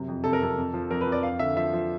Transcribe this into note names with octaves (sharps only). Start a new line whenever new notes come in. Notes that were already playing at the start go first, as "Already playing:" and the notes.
Already playing: F#2 C3
F2
C3 A4
A#4
F2 A4
F2
F3
F2 A#4
B4
F2
D5
F2 F5
D3 E5
F3 E5
F3